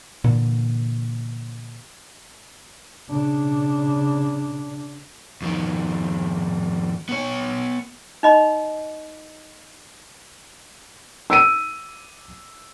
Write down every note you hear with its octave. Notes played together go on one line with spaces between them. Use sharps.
A#2 D3 E3
C#3 D4
F2 D#3
B3 C#5
D#4 D#5 B5
E6 D7 D#7